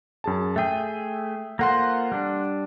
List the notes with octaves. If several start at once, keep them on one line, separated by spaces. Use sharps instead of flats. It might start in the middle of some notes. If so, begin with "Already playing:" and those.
F#2 G#4 A5
A3 G#4 E5 G5
A#3 F4 A4 C5 F#5 C6
G3 D4